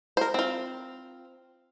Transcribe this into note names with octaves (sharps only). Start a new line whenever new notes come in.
A#4 C5
C4 F4